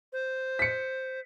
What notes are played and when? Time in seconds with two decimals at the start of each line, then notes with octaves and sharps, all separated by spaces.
0.13 C5
0.59 B6 C#7